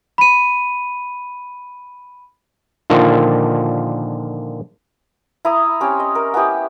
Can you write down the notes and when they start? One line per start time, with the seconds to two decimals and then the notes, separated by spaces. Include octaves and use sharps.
0.18 B5 D#7
2.90 A#2 D3 D#3 F3
5.45 E4 A#5 D#6
5.81 C4 C#4 G4
6.00 D#5
6.15 A#4
6.34 B3 C#4 E4 G4